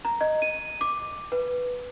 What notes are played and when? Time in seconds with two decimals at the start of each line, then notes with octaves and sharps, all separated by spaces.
0.05 A#5
0.21 D#5
0.42 D#7
0.81 D6
1.32 B4